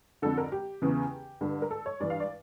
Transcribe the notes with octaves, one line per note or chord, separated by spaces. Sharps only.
F2 D3 A4
A#4
G4
E2 C#3 E3
G2 D3
A#4
A4
C#5
G2 E3 D5
F5
D5